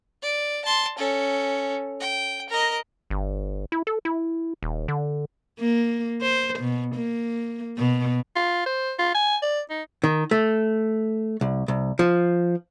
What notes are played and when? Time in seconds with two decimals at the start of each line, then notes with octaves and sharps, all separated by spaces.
0.22 D5
0.65 A5 C6
0.98 C#4 A4
2.00 G5
2.49 A#4 D#5
3.10 G1
3.72 E4
3.87 A4
4.05 E4
4.63 D#1
4.88 D3
5.60 A#3
6.22 C5
6.59 B2
6.95 A#3
7.78 B2
8.36 F4
8.66 C5
8.99 F4
9.14 G#5
9.42 D5
9.70 D#4
10.04 D#3
10.31 A3
11.41 C2
11.68 C2
11.99 F3